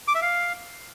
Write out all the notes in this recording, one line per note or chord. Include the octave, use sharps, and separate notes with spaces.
D6
E5
F5